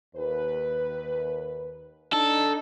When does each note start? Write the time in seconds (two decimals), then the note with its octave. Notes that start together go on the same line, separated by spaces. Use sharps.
0.15 D#2 B4
2.13 D4 D#4 A4